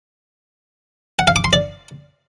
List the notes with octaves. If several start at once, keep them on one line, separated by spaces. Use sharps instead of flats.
F#5
F5
D6
C6
D5